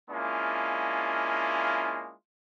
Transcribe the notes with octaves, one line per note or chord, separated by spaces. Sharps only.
G#3 A#3 C#4 D4 E4 F4